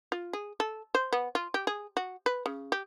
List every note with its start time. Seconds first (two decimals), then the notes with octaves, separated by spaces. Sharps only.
0.12 F4
0.33 G#4
0.60 A4
0.95 C5
1.13 B3
1.35 F4
1.54 G4
1.67 G#4
1.97 F#4
2.26 B4
2.46 C#3
2.72 G4